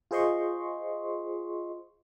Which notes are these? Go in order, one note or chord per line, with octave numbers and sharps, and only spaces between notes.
F4 G#4 C5 D#5 C6 C#6